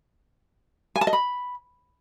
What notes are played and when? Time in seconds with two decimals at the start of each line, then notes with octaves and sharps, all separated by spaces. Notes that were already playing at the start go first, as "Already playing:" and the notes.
0.96 G#5
1.01 A5
1.07 D#5
1.13 B5